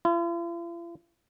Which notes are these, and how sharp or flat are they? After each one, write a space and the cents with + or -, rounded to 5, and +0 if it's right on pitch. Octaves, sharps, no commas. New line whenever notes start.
F4 -45